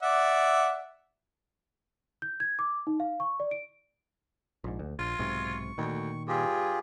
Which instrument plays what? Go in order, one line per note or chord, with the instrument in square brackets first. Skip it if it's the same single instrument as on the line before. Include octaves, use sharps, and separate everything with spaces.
[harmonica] D5 E5 F#5
[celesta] G6
G#6
D6
D#4
F5
C#6
D5
D7
[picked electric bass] A#1 G#2
D2
[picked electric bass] A#1 [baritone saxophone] F4
[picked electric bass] B1 G#2 C3 [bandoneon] C#6
[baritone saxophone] D2 [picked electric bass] A#2 D#3
[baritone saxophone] G2 [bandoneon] F4 G4 G#4